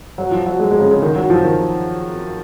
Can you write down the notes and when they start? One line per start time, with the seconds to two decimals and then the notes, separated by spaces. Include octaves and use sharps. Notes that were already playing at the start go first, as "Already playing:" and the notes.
0.18 F#3
0.31 F3
0.46 F#3
0.59 G#3
0.71 G#3
0.80 C#3
0.91 C#3
1.02 D#3
1.16 F#3
1.30 F3
1.44 D#3